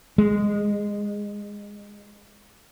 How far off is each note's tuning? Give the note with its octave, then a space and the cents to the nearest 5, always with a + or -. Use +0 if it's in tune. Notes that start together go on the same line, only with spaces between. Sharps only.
G#3 -15